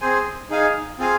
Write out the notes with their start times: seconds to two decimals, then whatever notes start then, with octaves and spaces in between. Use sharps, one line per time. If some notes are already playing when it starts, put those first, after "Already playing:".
0.01 C4 G#4 C5 G#5
0.50 D#4 G#4 F5 G#5
0.98 C4 F4 G#4 F5 G#5